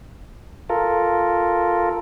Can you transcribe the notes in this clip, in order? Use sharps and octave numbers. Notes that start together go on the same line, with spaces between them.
F4 A4 A#4